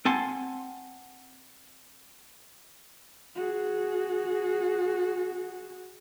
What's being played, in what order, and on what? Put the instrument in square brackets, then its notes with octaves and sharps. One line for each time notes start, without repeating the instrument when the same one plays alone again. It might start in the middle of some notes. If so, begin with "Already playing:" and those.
[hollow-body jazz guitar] C4 F#5 G#5 A5 C6
[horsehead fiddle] F#4 G#4